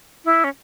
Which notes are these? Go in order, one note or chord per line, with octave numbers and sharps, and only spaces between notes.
E4
C#4